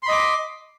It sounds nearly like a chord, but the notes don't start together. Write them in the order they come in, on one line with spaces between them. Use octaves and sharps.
C6 B5 D#5 D6